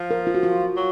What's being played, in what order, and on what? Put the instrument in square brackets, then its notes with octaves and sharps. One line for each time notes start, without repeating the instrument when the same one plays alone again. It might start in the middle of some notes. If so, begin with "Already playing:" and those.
Already playing: [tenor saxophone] F3
[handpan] A#4
F4
F#4
F4
[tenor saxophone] F#3